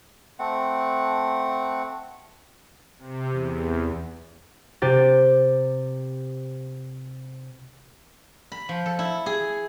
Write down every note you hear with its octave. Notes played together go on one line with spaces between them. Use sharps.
A3 C4 F#5
C3
E2
C3 G4 A6
B5
F3
A4
E4
G#4